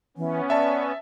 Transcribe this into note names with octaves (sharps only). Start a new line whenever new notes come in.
E3 B3 C#4
D5 E5 A5